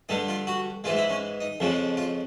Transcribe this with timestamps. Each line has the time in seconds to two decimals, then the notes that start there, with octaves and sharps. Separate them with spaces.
0.09 G2 D3 G3 D#4
0.28 F4
0.47 F#4
0.84 G#2 E3 G#3 F4
0.97 E4
1.10 C#4
1.41 D#4
1.60 F2 C#3 F3 G#3
1.97 F4